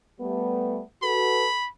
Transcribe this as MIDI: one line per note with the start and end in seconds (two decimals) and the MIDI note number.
0.20 0.80 55
0.20 0.80 57
0.20 0.80 59
1.03 1.47 66
1.03 1.47 69
1.03 1.47 71
1.03 1.69 83